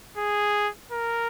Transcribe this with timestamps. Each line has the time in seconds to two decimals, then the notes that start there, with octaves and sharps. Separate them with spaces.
0.17 G#4
0.92 A#4